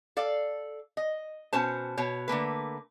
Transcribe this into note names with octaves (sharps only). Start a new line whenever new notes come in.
A4 D5 F5
D#5
B2 C#4 C5 A5
B2 C#5
D3 A3 A#3 B4